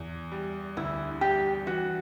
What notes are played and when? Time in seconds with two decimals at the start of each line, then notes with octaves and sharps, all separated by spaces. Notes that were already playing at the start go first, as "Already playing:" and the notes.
Already playing: E2
0.32 G3
0.77 D2 E4
1.21 G3 G4
1.66 E3 F#4